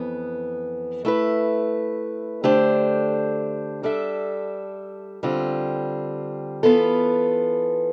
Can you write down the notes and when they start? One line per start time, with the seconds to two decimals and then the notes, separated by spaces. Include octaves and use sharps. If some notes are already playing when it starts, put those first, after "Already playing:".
Already playing: F2 E3 B3
1.05 A3 E4 B4
2.44 D3 A3 D4 G4 C5
3.83 G3 D4 A4 E5
5.23 D3 G3 C4 F4
6.63 E3 B3 F4 A4